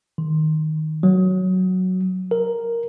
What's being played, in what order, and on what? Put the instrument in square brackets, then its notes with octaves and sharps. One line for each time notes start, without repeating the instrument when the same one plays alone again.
[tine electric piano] D#3
F#3
A#4